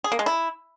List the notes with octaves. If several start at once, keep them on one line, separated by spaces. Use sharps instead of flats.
G#4
A#3
G#3
E4